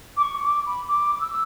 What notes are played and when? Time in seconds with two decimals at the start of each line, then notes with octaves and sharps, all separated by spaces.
0.16 D6
0.22 C#6
0.44 D6
0.66 B5
0.87 D6
1.15 D6
1.20 E6